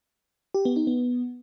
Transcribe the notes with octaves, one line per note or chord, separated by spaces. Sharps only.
G4
B3
D#4
B3